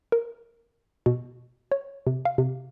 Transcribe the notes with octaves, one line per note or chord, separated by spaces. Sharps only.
A#4
B2
C#5
C3
F5
C3